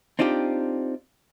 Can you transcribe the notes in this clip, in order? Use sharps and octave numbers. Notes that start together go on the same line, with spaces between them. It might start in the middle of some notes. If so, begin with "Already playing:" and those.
C4 D4 D#4 F4 G4